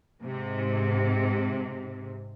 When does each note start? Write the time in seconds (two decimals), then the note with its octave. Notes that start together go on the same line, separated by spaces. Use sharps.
0.22 G#2 C3